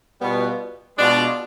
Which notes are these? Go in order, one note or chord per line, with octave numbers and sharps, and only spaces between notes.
B2 G3 B3 F4
B2 G#3 D4 F4